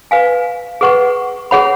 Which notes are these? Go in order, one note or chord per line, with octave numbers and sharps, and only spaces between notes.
B4 F5 G#5
G#4 B4 F#5 C#6
G#4 C#5 F#5 B5